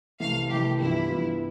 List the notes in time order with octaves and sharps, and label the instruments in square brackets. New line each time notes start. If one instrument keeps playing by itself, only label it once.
[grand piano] C2 C3 E3 A3 [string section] F5
[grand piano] C2 C3 E3 A3 [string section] G4
[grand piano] G2 E3 G3 B3 F4 [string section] E4
[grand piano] G2 E3 G3 B3 F4